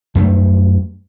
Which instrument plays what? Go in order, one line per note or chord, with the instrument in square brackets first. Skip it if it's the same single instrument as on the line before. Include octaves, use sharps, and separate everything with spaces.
[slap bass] F#2 G3 A3